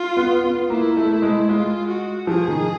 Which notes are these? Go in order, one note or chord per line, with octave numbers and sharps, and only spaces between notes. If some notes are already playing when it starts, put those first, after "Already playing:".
Already playing: F4
B3
B3
A#3 E4
A3
G#3
G#3 F4
F#4
F3 G#4
D#3